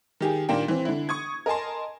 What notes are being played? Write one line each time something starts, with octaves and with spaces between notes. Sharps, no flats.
D#3 G4 G#4
A#2 D#3 A#3 D4 G5
E3 C4
D3 E4
C#6 D#6 G#6
A#4 D#5 G#5 A5 C6